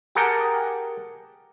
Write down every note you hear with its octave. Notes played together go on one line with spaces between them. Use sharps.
G4 G#4 A#4 F#5 G5 A5